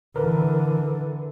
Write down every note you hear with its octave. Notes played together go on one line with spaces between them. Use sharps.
D3 E3 A#4 B4